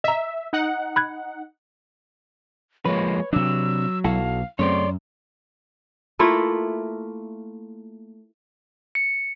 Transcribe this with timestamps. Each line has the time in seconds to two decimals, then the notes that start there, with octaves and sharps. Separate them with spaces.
0.04 D#5 E5 A#5
0.53 D#4 F#5
0.96 B5 F#6 G#6
2.85 F3 G#3 A#3 B4 C#5
3.33 C3 F#3 D4 E6
4.04 B1 E4 F#4 A4 F5
4.59 F#2 C#3 A3 C4 C#5 D5 C6
6.19 A3 A#3 E4 F4
8.95 C#7